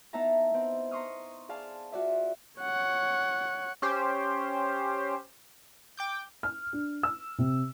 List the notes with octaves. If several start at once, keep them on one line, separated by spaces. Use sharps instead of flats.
B3 D#4 E4 E5 A5 A#5
B3 C4
A#5 C6 C#6 D#6 F6
G#4 D5 F5 A5
F4 F#4 D5 E5
C#5 F#5
C#4 G4 C5
G5 D6 G6
F6
D4
E6
C3